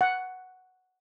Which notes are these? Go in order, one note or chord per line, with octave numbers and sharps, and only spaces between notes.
F#5